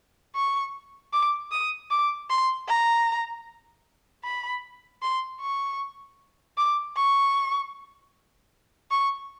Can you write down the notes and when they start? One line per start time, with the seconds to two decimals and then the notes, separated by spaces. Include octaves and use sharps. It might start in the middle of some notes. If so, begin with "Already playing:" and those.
0.35 C#6
1.13 D6
1.52 D#6
1.91 D6
2.30 C6
2.69 A#5
4.24 B5
5.02 C6
5.41 C#6
6.57 D6
6.96 C#6
8.91 C#6